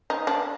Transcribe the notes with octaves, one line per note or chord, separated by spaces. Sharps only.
D#4
D4